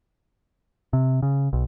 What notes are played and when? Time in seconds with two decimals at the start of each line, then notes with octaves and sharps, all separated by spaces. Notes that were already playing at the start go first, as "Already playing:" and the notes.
0.93 C3
1.22 C#3
1.53 B1